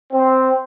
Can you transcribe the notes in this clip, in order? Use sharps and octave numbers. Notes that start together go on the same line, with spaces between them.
C4